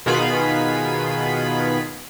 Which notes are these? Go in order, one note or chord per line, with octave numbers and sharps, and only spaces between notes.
B2 D#3 B3 F4 G#4 B5